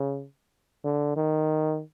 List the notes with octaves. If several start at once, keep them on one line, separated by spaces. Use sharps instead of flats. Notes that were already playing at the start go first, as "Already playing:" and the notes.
Already playing: C#3
D3
D#3